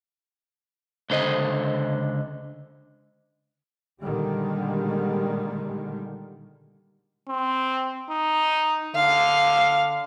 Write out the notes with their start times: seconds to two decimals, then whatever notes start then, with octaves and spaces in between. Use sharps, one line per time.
1.10 C#2 D3 C5 D#5
4.03 A#2 D3 D#3 G3 G#3
7.29 C4
8.10 D#4
8.96 D3 F5